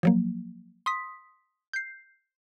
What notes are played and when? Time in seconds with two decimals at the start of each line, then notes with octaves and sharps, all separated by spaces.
0.03 F3 F#3 A#3
0.86 C6 D#6 B6
1.73 G6 C7